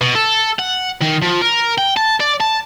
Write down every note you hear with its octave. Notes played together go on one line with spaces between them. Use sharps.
B2
A4
F#5
D#3
F3
A#4
G5
A5
D5
A5